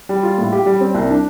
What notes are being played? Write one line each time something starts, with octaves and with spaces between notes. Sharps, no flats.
G3
F4
A2
G4
G3
C4
C2
D4